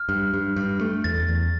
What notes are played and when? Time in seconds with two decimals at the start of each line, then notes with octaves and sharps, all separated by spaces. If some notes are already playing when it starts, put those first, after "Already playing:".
Already playing: F6
0.09 G2
0.34 G2
0.56 G2
0.81 A3
1.04 E2 A6
1.28 E2